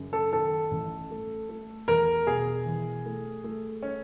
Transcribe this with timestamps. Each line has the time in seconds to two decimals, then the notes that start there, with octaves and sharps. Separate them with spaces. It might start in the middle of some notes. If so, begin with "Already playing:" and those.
Already playing: F#2 C#3
0.13 A4
0.32 D#3 A4
0.71 A1
1.11 A3
1.49 A3
1.88 E2 A#4
2.27 B2 G#4
2.66 E3
3.06 A3
3.44 A3
3.83 C#4